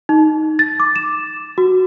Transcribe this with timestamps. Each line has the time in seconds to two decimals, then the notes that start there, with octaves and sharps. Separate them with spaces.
0.09 D#4
0.59 A6
0.80 D6
0.96 E7
1.58 F#4